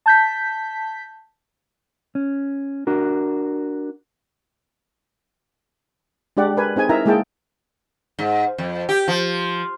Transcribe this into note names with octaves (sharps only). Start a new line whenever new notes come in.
A5 G6 B6
C#4
D4 F#4 A#4
G#3 D4 G4 D5 F#5
A#4 B4 G#5
C4 D#4 G#4 G#5
D#4 E4 A#4 E5 A#5
G#3 A#3 E4 G#4 G5 A5
G#2
F2
G4
F3